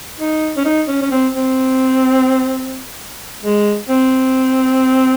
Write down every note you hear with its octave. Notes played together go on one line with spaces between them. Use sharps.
D#4
C#4
D#4
C#4
C#4
C4
C4
G#3
C4